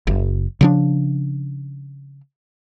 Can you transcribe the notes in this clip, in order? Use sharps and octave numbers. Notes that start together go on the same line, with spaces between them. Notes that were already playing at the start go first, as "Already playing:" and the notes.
F#1
C#3 F3 D4